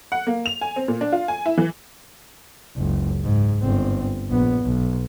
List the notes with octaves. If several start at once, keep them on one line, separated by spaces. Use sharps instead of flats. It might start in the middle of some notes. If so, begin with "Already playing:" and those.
F#5
A#3
F7
G#5
C4
A#2
D4
F4
G#5
E4
E3
F#1 C#2
G#2
G1 C4
A#1 B3
B1